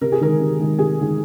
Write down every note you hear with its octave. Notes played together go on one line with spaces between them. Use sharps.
C3 A#4
G#4
D#3 G#3 A#4
C3
D#3 G#3
C3 G#4
D#3 G#3